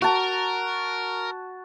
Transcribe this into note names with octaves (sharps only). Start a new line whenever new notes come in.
F#4 A#4 A5